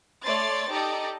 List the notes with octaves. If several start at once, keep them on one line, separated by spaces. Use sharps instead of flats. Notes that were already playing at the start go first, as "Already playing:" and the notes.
A3 C#5 D5 C6 A6
D#4 G4 A4 D5 D#5